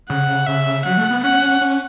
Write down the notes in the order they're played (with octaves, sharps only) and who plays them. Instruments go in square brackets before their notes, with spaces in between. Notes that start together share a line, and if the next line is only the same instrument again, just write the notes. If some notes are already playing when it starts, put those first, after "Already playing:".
[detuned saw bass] C#3 [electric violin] F#5
[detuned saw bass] C#3 [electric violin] E5
[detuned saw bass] F#3 [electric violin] F#5
[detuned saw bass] A3
B3
[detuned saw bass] C#4 [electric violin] F#5
[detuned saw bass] C#4